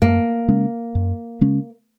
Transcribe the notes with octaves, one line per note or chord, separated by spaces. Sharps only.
F#2 A#3
C#3 G#3 C#4
F#2
C#3 G#3 C#4